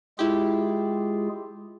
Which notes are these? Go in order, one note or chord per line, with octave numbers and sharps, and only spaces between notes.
G#3 E4 F4 G4 G#4